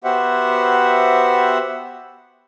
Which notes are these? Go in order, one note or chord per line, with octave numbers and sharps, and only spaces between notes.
B3 F#4 G4 C5 E5 F#5